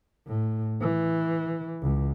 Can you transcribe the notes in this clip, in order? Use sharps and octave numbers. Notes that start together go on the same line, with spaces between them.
A2
E3
C#2